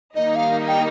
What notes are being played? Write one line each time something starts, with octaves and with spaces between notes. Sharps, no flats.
D#3 G3 A#3 D#4 D#5
F5
G5